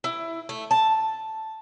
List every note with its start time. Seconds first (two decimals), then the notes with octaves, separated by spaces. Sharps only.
0.04 E4
0.49 A3
0.71 A5